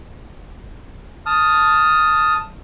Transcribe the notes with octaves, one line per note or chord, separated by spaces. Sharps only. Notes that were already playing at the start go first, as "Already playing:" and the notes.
A5 D#6 F6